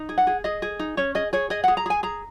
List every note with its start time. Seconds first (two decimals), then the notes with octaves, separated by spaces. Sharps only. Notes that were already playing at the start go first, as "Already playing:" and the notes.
Already playing: D#4
0.09 G#4
0.18 F#5
0.27 G#4
0.44 G#4 D#5
0.62 G#4
0.79 D#4
0.97 C#4 C#5
1.15 G#4 D#5
1.33 G#4 C#5
1.50 G#4 D#5
1.64 F#5
1.68 G#4
1.77 A#5
1.86 G#4 G#5
2.03 G#4 A#5